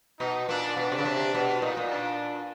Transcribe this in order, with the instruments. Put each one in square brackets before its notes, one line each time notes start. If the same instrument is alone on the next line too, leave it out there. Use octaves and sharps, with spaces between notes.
[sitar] B2 [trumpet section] D#4
[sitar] A#2 [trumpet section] D4
[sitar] B2 [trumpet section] D4
[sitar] C3
C#3
C3
B2
[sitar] A#2 [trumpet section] D#4
[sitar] A#2
[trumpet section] D4